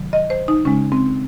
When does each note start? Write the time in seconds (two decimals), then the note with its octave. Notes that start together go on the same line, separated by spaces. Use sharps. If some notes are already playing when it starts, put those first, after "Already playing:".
Already playing: C3 D#3 F#3
0.13 D#5
0.30 C5
0.48 D#4
0.65 C#3 G#3 C#4
0.92 C4